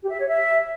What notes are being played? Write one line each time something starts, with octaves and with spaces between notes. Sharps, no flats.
G4
E5
C#5
E5